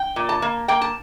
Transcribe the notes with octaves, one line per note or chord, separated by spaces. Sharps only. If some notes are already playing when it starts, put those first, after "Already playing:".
Already playing: G5
A#2
A5
A#3
A#3 G5
A5